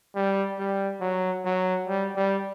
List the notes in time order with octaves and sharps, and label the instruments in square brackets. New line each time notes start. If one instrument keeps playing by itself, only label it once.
[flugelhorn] G3
G3
F#3
F#3
G3
G3